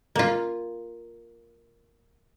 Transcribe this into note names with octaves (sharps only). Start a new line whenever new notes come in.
A#3 F4